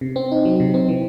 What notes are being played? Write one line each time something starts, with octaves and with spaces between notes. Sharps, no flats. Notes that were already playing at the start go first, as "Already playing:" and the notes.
C3
C4
D#4
F#3
C3
C4
E3